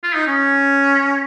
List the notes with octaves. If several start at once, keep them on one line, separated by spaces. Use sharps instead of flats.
F4
D#4
C#4